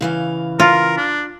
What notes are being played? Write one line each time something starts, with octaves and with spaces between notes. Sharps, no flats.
C#3 E3 F5
F4 A#4
D4